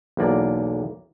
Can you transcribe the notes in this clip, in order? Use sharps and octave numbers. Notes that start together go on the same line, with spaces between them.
B1 E2 A#3 D5